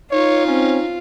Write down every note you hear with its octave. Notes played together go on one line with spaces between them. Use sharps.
D#4 F4 C#5
C4 C#4